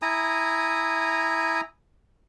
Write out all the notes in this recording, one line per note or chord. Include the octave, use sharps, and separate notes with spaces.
E4 G#5 A#5 D#6